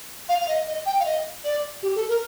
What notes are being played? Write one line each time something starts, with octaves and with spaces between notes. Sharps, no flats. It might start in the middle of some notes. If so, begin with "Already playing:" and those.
F5
F5
D#5
D#5
G5
F5
D#5
D5
G4
A4
A#4